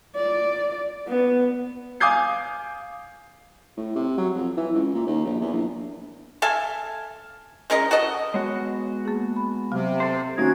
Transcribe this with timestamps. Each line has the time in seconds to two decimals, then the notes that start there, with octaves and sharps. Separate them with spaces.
0.16 D5
1.08 B3
2.00 F5 G#5 D6 D#6 G6 C7
3.77 A2
3.96 C3
4.17 F#3
4.35 F2
4.57 E3
4.74 C#2
4.94 A#2
5.07 D#2
5.25 A#1
5.41 E2
5.53 A#1
6.42 A4 E5 F5 G#5
7.70 G#3 C#4 A#4 D#5
7.91 F#4 A4 D#5
8.34 G#3 B3 F#4 C#5
9.05 A#3 G#4
9.36 B5
9.72 C3 F#3
10.00 A4 C5
10.38 D#3 A#3 C#4 D#4 F#4 G#6